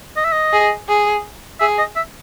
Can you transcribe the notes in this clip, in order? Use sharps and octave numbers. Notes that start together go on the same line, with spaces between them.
D#5
E5
D#5
G#4
G#4
G#4 E5
D#5
E5